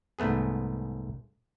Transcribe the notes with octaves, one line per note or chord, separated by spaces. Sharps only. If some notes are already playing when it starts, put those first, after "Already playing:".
C2 G#2 A3 B3 G#4